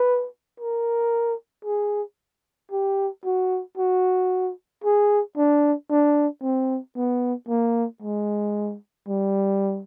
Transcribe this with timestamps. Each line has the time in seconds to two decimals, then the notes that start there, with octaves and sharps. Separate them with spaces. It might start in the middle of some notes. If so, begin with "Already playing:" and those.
Already playing: B4
0.60 A#4
1.65 G#4
2.71 G4
3.25 F#4
3.77 F#4
4.84 G#4
5.37 D4
5.90 D4
6.42 C4
6.97 B3
7.49 A#3
8.02 G#3
9.08 G3